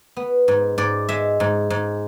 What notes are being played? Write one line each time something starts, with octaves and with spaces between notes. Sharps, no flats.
B3
G#2
G#2 D5
G#3 E5
G#2
G#2